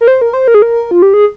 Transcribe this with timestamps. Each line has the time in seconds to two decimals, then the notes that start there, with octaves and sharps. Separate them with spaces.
0.01 A#4
0.08 C5
0.21 A#4
0.33 C5
0.48 A#4
0.54 G#4
0.62 A#4
0.91 F4
1.02 G4
1.14 G#4